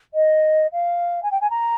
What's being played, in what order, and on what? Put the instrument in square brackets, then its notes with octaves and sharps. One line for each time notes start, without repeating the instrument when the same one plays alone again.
[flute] D#5
F5
G#5
G5
G#5
A#5